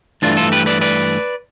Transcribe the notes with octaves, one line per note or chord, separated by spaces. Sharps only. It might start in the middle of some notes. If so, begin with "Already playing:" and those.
G2 E3 A3 D4 F4
F4 A4
G4 B4
B4 D5
B4 D5